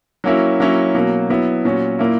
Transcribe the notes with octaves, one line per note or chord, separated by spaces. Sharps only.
F#3 A#3 C#4 E4
F#3 A#3 C#4 E4
B2 F#3 A#3
F#3 B3 E4
A#2 F#3 C#4
A#2 A#3 E4